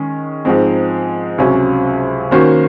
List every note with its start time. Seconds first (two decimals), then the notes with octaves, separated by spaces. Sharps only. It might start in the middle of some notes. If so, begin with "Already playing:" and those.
Already playing: D#3 G#3 C#4
0.45 G#2 F3 G#3 C4
1.38 C#2 C3 F#3 C#4
2.31 D#3 A#3 C#4 F#4 C5